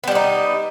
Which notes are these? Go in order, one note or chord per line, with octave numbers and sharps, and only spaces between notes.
G3 B3 D4 D#4